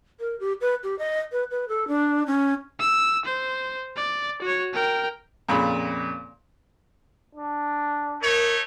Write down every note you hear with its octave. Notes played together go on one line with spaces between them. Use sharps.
A#4
G4
B4
G4
D#5
B4
B4
A4
D4
C#4
E6
C5
D5
F#4 C#5
A#4 G5
F2 A#2 C#3 B5
D4
A3 D#4 A#4 C#5